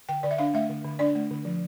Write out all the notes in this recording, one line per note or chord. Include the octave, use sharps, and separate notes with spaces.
D3 G5
D3 D5
E5
D4 F5
A3 E5
D3
D3
D4 D5
A3
D3
F3